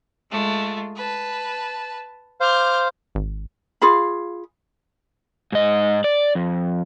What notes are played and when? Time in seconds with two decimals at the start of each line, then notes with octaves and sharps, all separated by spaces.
0.30 G#3 A3 F4
0.96 B4 A5
2.40 C5 F5 D6 F6 G6
3.15 G#1
3.82 F4 G#4 F5 B5
5.52 G#2 D#5
6.04 D5
6.35 F2